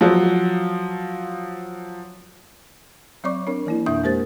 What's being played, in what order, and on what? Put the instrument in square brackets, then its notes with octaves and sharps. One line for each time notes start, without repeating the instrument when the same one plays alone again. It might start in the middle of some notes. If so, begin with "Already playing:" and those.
[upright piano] F3 F#3
[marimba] F#3 C4 C#5 D5 C#6 D6
C4 D4 A#4 C#5
E3 A#3 E4
F2 B2 D4 E5 D#6 G6
G#3 A#3 G4 A#4 C5 A6